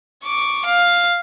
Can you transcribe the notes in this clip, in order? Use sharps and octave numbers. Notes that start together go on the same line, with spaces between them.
C#6 D6
F5